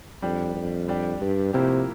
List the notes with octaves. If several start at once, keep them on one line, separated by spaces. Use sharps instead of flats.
F2 G3 D4 G4
F2
G3 D4 G4
G2
A2 C3 F3 A#3 E4 G4